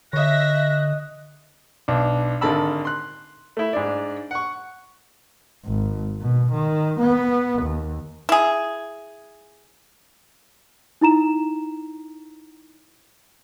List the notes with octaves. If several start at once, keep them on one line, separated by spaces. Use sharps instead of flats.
D3 C#5 D#5 E5 F#6 A#6
B1 D4
G#1 D3 A#4 A5 B5 E6
C6 F#6
A3 E4
G#2 D4 D5
F#5 C#6
G#1
B2
D#3
B3
D#2
E4 G#4
D#4 E4 A#5 E7